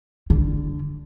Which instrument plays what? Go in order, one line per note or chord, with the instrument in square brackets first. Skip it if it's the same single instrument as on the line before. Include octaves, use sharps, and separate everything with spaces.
[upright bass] D3